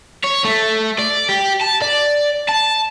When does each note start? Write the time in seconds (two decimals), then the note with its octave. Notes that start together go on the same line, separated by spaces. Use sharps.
0.24 C#5
0.44 A3
0.99 D5
1.29 G4
1.61 A5
1.82 D5
2.49 A5